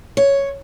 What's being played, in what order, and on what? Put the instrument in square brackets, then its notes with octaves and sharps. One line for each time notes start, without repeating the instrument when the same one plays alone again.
[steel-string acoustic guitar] C#5